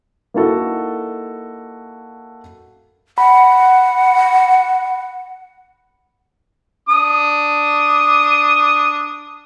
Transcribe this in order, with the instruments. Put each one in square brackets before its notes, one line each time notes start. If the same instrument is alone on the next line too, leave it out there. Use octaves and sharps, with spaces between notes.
[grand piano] A#3 D#4 E4 F#4 A4
[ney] F#5 [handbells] B5
[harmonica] D4 D#6